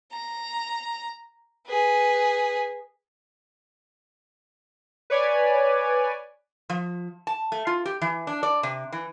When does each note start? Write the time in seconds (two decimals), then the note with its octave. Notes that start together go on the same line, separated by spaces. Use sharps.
0.12 A#5
1.67 G#4 B4
5.10 B4 C#5 D5 G#5
6.70 F3
7.27 A5
7.52 A3
7.67 F4
7.86 G4
8.01 E3
8.27 D4
8.43 D5
8.63 C3
8.92 E3